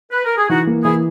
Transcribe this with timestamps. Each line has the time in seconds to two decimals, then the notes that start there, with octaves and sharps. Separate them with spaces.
0.12 B4
0.25 A#4
0.38 G#4
0.49 E3 D#4 F#4
0.67 A#3
0.84 E3 E4 G#4